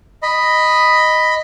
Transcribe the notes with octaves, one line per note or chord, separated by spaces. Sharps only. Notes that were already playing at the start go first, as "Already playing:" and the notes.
D#5 B5